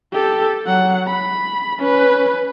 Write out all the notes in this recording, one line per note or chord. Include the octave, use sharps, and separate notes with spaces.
G4 A4
F#3 F#5
B5
C#4 B4